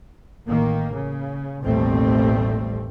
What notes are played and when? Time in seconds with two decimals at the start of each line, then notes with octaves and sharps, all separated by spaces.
0.48 A1 D#3 A#3
0.92 C#3
1.62 A1 D#2 B2 G3 A3 C4